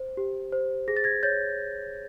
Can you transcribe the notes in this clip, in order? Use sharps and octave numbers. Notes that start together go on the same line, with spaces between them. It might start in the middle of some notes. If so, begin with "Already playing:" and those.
Already playing: C5
G4
C5
G#4 A#6
A6
G#6 A#6
C#5 G6 A6